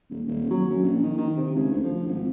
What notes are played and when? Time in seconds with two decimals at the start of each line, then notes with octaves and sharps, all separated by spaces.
0.10 D#1
0.27 D#1
0.50 F#3
0.70 F#2
0.83 A#1
1.02 D#3
1.17 D#3
1.37 C3
1.55 C#2
1.71 D2
1.83 F3
2.07 G#1